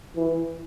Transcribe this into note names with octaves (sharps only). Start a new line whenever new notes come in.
E3